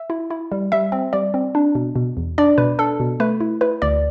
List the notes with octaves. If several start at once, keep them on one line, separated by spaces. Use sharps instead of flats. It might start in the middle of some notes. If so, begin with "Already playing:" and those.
Already playing: E5
E4
E4
G3
G3 E5
C4
G3 D5
C4
D4
B2
B2
E2
D4 D5
B2 B4
D4 A4
B2
A3 B4
E4
E4 B4
D2 D5